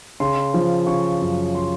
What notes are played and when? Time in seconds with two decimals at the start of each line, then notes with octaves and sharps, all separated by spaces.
0.20 C#3 C6
0.54 F3
0.87 C#3 C#6
1.21 F#2
1.55 C6